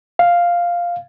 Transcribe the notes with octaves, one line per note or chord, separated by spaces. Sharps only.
F5